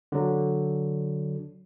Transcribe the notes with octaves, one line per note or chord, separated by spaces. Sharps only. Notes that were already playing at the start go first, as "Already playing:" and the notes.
D3 F#3